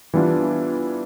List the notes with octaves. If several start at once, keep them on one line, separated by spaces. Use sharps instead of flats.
E3 G3 B3 D4 F4